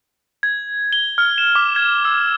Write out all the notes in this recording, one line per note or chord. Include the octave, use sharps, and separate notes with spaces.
G#6
G7
F6
E7
D6
G#6
E6